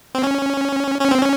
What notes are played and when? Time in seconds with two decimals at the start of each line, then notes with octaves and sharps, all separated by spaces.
0.15 C4
0.23 C#4
1.01 C#4
1.11 C4
1.22 C#4